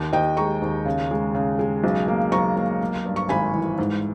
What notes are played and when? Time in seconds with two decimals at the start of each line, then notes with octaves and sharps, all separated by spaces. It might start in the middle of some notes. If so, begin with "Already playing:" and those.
Already playing: D#2
0.13 D#2 D#5 G5
0.37 G#3 A#5 C#6
0.62 D#2
0.85 C#3
1.11 G#3
1.35 C#3
1.59 G#3
1.84 B1
2.08 A#3
2.32 B1 A#5 C#6
2.56 A#3
2.81 A#3
3.06 G2
3.16 C#6
3.29 G#1 G#5 B5
3.54 E3
3.78 G#2